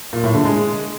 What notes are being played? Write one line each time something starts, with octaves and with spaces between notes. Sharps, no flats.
A#2
A2
D3
G#3